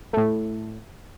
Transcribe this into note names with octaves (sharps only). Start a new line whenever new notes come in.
A2 A3